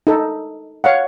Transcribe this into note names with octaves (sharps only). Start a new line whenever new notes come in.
D#4 A4
C#5 F5 F#5